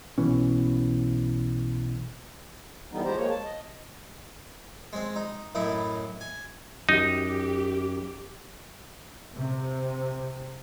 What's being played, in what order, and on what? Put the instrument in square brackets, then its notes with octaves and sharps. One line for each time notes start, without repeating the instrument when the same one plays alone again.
[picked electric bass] B1 B2 E3 C#4
[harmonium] D3 E3 G3 B3 D#4
F3 G#3 G4 C5 A#5
G#3 A#3 C#5
A5
D#5
[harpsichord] G#3 C4
D#4
F#2 A2 D#4 E4
G#5
[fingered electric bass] F#2 [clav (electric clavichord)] D#4 [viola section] G4
[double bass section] C3